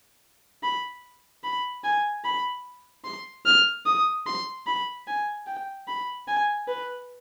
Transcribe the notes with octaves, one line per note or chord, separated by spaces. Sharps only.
B5
B5
G#5
B5
C6
F6
D#6
C6
B5
G#5
G5
B5
G#5
B4